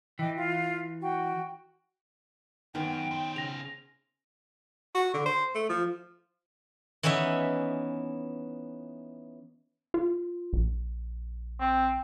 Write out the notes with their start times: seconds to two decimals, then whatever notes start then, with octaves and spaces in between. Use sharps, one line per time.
0.19 E3 D#5 G5 D6
0.36 F4
1.00 F#4 G5
2.75 F#2 D#3 B3 A#4 G5
3.11 C#4 C5
3.36 C#3 A#6 F7
4.95 F#4
5.14 D3
5.26 C5
5.55 A3
5.69 F3
7.03 E3 B3 C#4 D#4 E5
9.94 F4
10.53 A#1
11.60 C4